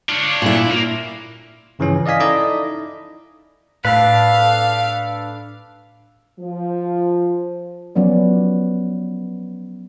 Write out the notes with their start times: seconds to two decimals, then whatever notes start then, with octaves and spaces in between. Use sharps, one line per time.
0.09 D4 F4 C#5
0.42 A#2 E4
0.71 A#3
1.79 G2 C#3 E3 F3 C#4
2.06 D5 D#5 F5 G#5 B6
2.20 D#4 E4 A4 D5 D#5
3.85 A2 D4 A4 B4 F5
6.40 F3
7.95 F3 F#3 B3 C#4 D5